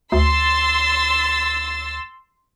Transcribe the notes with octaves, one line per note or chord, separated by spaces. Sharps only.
D2 C6 E6 A6